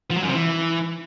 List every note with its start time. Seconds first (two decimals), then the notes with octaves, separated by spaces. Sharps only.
0.11 F3
0.17 F#3
0.22 F#2
0.28 C3
0.34 E3